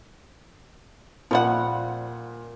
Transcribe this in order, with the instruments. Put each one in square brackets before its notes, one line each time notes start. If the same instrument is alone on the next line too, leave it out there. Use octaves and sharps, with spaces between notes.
[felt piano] A#2 [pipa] F3 G3 F#5